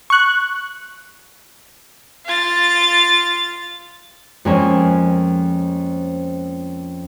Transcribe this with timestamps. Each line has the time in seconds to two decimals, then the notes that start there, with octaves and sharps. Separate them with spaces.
0.10 C#6 F#6
2.25 F4 A6
4.45 F2 G#3 A#3 C4 C#4